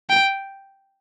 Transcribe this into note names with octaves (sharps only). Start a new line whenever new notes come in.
G5